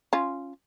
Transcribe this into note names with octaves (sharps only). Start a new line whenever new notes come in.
C#4 F4